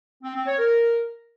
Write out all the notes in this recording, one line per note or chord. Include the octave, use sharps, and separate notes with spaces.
C4
C4
C#5
A#4